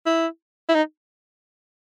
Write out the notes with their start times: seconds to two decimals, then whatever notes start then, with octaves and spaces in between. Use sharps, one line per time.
0.06 E4
0.69 E4
0.75 D#4